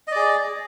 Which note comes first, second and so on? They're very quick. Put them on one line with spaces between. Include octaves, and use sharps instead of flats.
D#5 D5 G#4